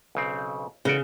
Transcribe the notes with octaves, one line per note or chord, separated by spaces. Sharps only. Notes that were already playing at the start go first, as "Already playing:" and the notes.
B1 C#3 C4
A1 C#3 F#4 D5